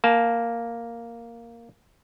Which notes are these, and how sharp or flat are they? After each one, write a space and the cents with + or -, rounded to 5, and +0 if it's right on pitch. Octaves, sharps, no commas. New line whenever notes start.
A#3 +0 A5 -20